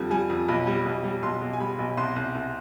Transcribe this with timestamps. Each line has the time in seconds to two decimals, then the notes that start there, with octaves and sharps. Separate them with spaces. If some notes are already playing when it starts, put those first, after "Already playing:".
Already playing: F2 D3 G3
0.11 G3 G#5
0.30 F2
0.48 B1 B5
0.67 G3
0.86 B1
1.04 G3
1.23 B1 C6
1.41 B1
1.53 G#5
1.60 G3 B5
1.79 B1
1.97 C2 C6
2.16 C2
2.35 C2